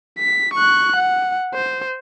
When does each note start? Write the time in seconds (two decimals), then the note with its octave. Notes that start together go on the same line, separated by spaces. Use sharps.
0.19 B6
0.54 C#6 F#6
0.96 F#5
1.55 C5